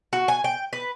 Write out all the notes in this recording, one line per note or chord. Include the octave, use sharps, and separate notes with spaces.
F#4
G#5
G5
B4